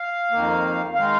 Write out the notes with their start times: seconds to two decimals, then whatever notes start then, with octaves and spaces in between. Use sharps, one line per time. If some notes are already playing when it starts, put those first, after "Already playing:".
Already playing: F5
0.31 F2 D#3 A#3
0.95 D#3 G#3 F5